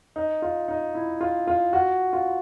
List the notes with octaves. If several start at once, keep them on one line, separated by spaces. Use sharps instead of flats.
D#4
F4
D#4
E4
F4
F4
F#4
F4